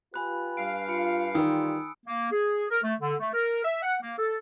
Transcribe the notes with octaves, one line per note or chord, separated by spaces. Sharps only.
F4 G4 B4 G#5 B5 F#6
G2 F5 D7
F4 B5 C#7 D7
D#3 E3 G3 F4 D#6 E6
A#3
G#4
A#4
A3
D3
A3
A#4
E5
F#5
A#3
A4